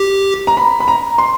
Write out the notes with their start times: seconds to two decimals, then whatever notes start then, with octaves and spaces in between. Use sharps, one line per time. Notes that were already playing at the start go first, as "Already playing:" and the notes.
Already playing: G4
0.47 A#5
0.57 B5
0.80 B5
0.88 A#5
1.18 C6